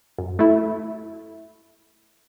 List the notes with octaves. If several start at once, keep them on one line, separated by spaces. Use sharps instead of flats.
F#2
A3 E4